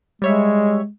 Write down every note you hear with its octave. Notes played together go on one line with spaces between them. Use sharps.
G3 G#3 C#5 E5